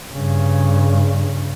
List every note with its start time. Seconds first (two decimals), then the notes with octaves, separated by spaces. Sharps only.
0.13 G2 C#3